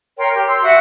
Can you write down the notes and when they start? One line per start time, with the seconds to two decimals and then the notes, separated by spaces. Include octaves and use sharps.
0.18 A#4 C#5 G5 C6
0.35 G4
0.48 C6 E6
0.62 F#4 E5 F#5